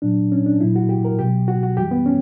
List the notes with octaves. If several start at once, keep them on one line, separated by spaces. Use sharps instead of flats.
A#2 F#3 D4
C#4
D4
A#2 F#3 E4
F#4
G4
A#4
C#2 B2 F#3 G4
F#4
F#4
F#2 E3 G3 G4
B3
C#4